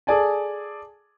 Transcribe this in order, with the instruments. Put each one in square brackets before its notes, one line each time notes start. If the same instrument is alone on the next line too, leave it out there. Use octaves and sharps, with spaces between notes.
[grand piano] G#4 A4 D5 G#5 A5